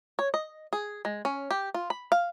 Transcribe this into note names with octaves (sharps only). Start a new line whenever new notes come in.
C#5
D#5
G#4
G#3
C#4
G4
F4
B5
F5